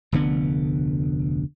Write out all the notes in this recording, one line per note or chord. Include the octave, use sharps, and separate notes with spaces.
F1 D2 D3 B3